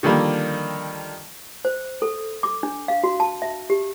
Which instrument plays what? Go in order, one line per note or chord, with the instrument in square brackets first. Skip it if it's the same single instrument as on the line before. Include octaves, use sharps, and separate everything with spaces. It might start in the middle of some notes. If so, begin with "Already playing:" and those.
[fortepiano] D3 D#3 F3 G3 A#3
[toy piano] C5
A4
D6
D4
F5
F#4
A5
E5
G4